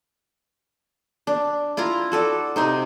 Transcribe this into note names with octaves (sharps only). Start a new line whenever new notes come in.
D4
E4 F4 F5 A#5
F#4 A4 D5
C3 D#4 C5